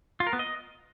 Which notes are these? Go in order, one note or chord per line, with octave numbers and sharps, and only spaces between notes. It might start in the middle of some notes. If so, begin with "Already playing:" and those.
F4
A#4
B3
D#5